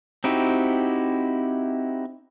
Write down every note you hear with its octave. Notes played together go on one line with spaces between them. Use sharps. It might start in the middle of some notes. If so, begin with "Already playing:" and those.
C4 D#4 E4 F#4 G4